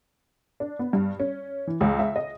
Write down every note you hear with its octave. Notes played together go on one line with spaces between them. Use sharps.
D4
B3
G2
C#4
E3
C#2
E5
D#5